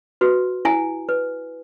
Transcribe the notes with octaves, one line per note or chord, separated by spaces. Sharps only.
F#4 B4
E4 G#5
B4